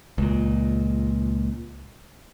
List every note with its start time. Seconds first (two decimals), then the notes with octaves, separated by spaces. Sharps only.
0.18 C#2 A#2